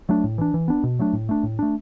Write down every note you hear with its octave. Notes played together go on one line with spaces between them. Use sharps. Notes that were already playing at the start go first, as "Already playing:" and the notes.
F#3 A3 D4
A2
E3 D4
E3
B3 D4
B2
F#3 A3 D4
A2
A3 D4
A2
A3 D4